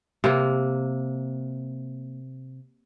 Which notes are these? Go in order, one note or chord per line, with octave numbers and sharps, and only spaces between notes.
C3 A#3